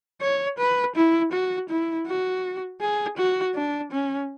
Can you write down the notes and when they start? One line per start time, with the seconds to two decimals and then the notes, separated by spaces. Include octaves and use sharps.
0.21 C#5
0.58 B4
0.96 E4
1.32 F#4
1.69 E4
2.07 F#4
2.81 G#4
3.17 F#4
3.55 D4
3.92 C#4